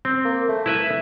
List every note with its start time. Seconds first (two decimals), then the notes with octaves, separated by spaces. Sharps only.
0.05 C4
0.25 A#3
0.49 A3
0.66 E4 B4 E5